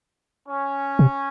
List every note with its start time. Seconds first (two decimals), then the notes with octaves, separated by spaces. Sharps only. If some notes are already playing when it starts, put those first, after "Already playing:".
0.48 C#4
0.99 C3